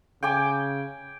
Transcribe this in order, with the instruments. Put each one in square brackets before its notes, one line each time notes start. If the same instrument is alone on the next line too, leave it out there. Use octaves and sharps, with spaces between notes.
[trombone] C#3 [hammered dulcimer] G5 G#5 D6